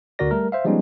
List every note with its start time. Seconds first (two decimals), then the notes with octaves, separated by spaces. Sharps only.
0.19 D2 D3 F#4 A#4 D5 A#6
0.31 G3 A3 A#4
0.52 C5 E5 F5
0.65 F3 G3 G#3 B3 C#4 D#4